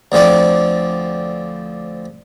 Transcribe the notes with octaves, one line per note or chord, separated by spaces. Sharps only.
D2 D3 F3 C4 D5